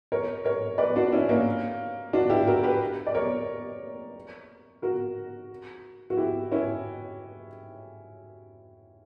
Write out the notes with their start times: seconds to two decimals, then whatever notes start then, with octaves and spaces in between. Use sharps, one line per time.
0.12 A#4 C#5
0.45 A#4 C#5
0.78 B4 D5
0.96 D4 F#4
1.12 C#4 E4
1.29 A#3 C#4
2.13 D4 F#4
2.30 E4 G4
2.47 F#4 A#4
2.63 G4 B4
3.07 D5
3.14 A#4 C#5
4.82 F#4 A#4
6.10 F#4
6.17 E4 G4
6.52 C#4 E4